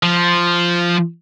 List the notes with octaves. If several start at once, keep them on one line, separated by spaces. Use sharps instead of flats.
F3